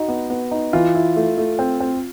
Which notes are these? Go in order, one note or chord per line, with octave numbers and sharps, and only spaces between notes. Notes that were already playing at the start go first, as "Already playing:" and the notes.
Already playing: D#4 F#4
B3
B3
D#4
E3 F4
E4
A3
A3
C4
C4